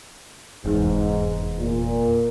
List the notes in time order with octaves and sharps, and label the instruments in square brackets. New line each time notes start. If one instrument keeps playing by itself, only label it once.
[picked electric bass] F1 E2 [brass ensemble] G#2
[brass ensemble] A#2